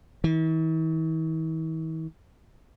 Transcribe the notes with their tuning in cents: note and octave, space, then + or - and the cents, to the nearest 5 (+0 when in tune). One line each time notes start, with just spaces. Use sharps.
E3 -45